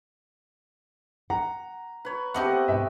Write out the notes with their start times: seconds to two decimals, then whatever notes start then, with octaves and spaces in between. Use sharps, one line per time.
1.30 F#5 A#5
2.05 B4 C#5
2.34 A3 B3 C4 G4 D#5 F#5 D6
2.68 G#2 B2 E5 G5